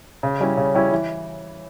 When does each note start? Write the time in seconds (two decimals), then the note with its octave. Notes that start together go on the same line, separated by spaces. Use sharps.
0.23 C#3
0.40 G3 C#4 E4
0.57 C#3
0.75 G3 C#4 E4
0.92 E3